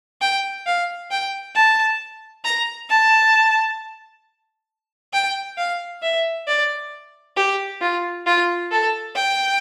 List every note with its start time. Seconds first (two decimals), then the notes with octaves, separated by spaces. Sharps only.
0.21 G5
0.66 F5
1.11 G5
1.55 A5
2.45 A#5
2.90 A5
5.13 G5
5.58 F5
6.03 E5
6.48 D5
7.37 G4
7.81 F4
8.26 F4
8.72 A4
9.16 G5